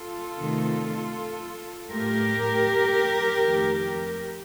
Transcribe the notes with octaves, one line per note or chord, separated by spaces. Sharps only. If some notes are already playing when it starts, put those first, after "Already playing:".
Already playing: F4 A4
C3 D#3 A3
A2 A3 G4 A#4
F2 D#3 A3